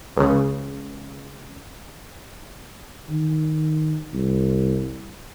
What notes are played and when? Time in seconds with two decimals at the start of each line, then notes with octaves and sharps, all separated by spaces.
0.17 C#2 C#3
3.09 D#3
4.14 C2